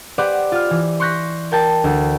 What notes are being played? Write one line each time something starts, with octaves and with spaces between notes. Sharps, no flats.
G4 B4 C5 D5 F#5
F4 F6
E3
C6 C#6 F#6 G6 A#6 B6
A#4 G5 A5
D2